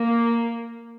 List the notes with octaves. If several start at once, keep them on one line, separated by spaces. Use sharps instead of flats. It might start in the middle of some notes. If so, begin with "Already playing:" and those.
Already playing: A#3